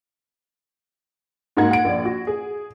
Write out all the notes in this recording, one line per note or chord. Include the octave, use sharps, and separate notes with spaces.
G#2 A#3 D#4 F#4 F#5 G#6
F#5 D7
A#1 D5
F#4
G#4